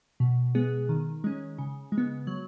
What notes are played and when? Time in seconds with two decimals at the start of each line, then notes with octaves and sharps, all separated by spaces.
0.20 B2
0.55 G#3 B3 G#4
0.89 D#3
1.24 G#3 C#4
1.58 C#3
1.92 G#3
1.98 B3
2.27 F#3